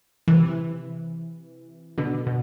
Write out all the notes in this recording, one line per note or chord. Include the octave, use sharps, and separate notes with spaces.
C3 E3
B2 D3
B2